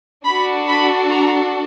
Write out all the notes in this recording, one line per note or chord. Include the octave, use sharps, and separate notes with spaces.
D4 F#4 A4 B5
B5
A#5